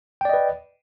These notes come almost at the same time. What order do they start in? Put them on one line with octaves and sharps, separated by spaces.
G5 D5 D#5 B4